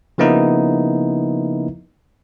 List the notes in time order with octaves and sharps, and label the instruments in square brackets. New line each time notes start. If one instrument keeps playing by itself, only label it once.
[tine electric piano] C#3 F3 A#3 B3 D#4 E4